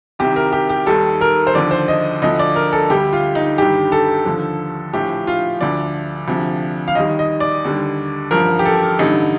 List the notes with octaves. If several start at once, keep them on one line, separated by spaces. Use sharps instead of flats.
C2 C3 D#3 G3 G4
A#4
G4
G4
D#2 D#3 G3 A4
A#4
C5
D#2 D3 F3 D5
C5
D#5
D2 D3 F3 D#5
D5
A#4
A4
D2 D3 G3 G4
F4
D#4
G1 G2 D#3 G3 G4
A4
D#2 D3 F3
A#1 A2 F3 G4
F4
D2 D3 F3 D5
D2 C3 F3
F5
D#2 D#3 G3 D#5
D#5
D5
D#2 D3 G3
A1 G2 F3 A#4
G4
A4
A1 G2 D3 G3 D#4